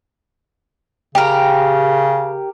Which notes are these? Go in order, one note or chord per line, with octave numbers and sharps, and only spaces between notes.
C#3 G4 A#4